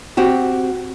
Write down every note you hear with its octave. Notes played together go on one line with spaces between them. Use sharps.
C4 F#4 G4